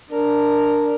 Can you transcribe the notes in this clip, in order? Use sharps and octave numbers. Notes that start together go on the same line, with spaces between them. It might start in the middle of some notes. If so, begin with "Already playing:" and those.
D4 A#4